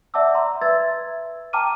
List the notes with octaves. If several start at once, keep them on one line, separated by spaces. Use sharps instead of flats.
D5 E5 F#5 A5 D6 E6
A#5 C6
B4 E5 E6 G#6 A6
G5 A5 A#5 D6 F6 D#7